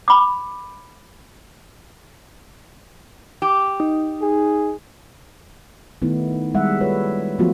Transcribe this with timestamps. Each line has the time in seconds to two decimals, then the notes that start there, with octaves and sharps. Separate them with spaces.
0.08 B5 D6
3.42 G4
3.80 D#4
4.22 G#4
6.02 D#3 A3 B3 D#4 E4
6.54 G3 G#3 E5 F#5
6.81 F4 A4 B4 C#5
7.39 F3 F#3 A3 B3 F4 F#4